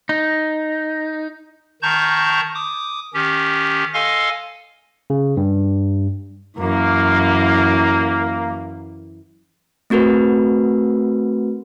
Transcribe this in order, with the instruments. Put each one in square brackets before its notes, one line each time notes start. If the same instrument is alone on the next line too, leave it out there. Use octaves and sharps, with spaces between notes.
[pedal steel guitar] D#4
[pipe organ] D#3 A5 A#5 C#6 G6
D6 D#6
D#3 C#4 G4
A4 D#5 F5 G#5 C6 A#6
[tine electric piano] C#3
G2
[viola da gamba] F#2 E3 [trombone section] A#3
[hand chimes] A3 C4 F#4 A#4 B4